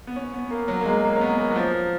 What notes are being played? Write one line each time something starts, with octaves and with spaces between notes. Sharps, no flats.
B3
C#4
B3
A#3
F#3
A#3
G#3
A#3
C#4
B3
A#3
F#3
F3